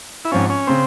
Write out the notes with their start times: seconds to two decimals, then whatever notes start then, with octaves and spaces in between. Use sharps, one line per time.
0.25 E4
0.31 G#2 F3 C4 C#4 F4
0.50 C#4
0.67 C#3 C4